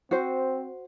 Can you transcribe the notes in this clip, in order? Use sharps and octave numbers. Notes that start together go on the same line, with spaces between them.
C4 F#4 C5